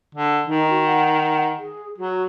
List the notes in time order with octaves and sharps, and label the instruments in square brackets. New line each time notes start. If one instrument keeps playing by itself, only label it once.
[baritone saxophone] D3
[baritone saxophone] D#3 [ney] D#4
[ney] F#4
F#5
G#4
[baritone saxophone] F#3 [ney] F#4